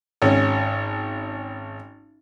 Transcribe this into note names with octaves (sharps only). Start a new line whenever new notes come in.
G#1 C#4